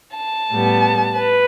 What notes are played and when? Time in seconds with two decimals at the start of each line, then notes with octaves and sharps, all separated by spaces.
0.16 A5
0.50 A2 G3 B3
1.16 B4